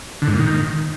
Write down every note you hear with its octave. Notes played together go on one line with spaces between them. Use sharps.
D3
G#2
A#2
D#3